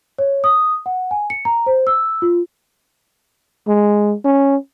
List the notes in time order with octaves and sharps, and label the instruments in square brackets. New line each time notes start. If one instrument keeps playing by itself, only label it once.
[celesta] C#5
D#6
F#5
G#5
C#7
A#5
C5
E6
F4
[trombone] G#3
C#4